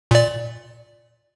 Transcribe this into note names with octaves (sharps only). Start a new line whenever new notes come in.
A#2 D5